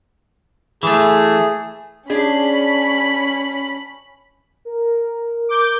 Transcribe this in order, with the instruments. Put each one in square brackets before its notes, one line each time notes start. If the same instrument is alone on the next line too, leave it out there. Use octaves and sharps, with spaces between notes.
[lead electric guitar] E3 A3 [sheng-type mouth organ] G#4
[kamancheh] C#4 B5 [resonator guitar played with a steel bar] D4 G#4
[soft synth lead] A#4
[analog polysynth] D6 G6